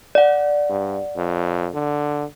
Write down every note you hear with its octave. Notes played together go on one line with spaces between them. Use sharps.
D5 F#5
G2
F2
D3